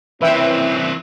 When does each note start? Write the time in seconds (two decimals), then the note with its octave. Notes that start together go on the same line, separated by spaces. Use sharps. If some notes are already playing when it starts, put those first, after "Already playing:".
0.22 E3 C4 C#4 E4 B4 E5 G5